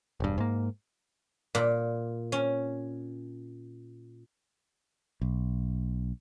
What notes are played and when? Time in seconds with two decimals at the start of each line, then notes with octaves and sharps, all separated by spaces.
0.20 E1 G2
0.38 G#2 A#3
1.55 A#2
2.32 C#4
5.21 B1